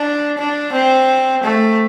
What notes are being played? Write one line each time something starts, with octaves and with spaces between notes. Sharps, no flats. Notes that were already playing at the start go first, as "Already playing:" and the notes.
Already playing: D4
D4
C4
A3